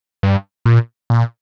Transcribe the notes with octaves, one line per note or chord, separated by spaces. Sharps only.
G2
A#2
A#2